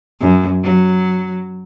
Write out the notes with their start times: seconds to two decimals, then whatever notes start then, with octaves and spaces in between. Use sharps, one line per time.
0.21 F#2
0.63 F#3